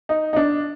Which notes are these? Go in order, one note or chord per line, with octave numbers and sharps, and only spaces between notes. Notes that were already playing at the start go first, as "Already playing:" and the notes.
D#4
D#4
D4